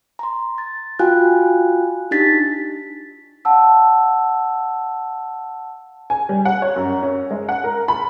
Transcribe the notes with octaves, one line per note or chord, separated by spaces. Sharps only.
A#5 C6
A6
F4 F#4 F5 G5 G#5 F#6
D4 D#4 G4 A6 B6
F5 F#5 A5 E6
G#5
G3
F#5
C#5
F#2
C#4
G#3
F#5
A#4
B5